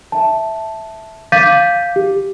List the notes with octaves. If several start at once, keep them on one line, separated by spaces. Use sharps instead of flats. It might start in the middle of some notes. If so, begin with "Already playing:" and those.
E5 A5
F5 D6 G6 A6 B6 D#7
G4